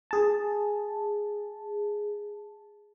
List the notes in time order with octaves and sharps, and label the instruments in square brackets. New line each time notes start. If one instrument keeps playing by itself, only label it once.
[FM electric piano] G#4 A5